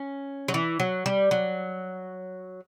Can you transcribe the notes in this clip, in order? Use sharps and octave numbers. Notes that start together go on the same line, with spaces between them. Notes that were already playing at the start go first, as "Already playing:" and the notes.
Already playing: C#4
F#3
E3
F#3
G3
F#3